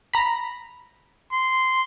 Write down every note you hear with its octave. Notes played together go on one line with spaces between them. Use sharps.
A#5 B5
C6